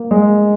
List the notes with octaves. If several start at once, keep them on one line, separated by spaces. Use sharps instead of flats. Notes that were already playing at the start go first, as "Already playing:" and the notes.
Already playing: A#3
G#3